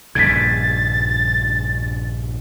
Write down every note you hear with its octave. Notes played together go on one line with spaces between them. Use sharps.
A#1 G2 C#3 G#6 A6 B6